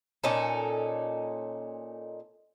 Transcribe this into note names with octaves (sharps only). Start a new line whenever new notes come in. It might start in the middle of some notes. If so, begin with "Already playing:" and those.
A#2 C#4 D#4 A4